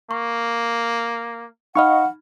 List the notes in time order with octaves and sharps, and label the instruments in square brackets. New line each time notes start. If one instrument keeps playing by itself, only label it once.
[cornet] A#3 [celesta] C#6
[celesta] D#4 B5 F6 [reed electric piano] D#5 F5 C#6 [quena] F#5